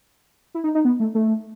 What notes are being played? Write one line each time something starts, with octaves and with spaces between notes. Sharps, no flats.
E4
D#4
D#4
B3
A3
A3